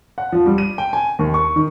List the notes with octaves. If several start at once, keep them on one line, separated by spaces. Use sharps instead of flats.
F#5
F3
G3
D#7
G5
G#5
D#2
C#6
D#3